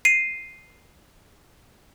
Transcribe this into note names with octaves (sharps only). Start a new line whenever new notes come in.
C7 D#7